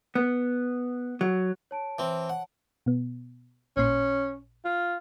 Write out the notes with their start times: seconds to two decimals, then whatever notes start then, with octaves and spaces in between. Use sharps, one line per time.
0.15 B3
1.21 F#3
1.71 C#5 A5 D7
1.98 E3 C4
2.30 F#5
2.86 B2 B3
3.77 A1 A#2 C#4 C6
4.65 F4